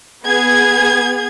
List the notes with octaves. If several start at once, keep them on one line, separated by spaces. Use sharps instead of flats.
B3 G#4 G#6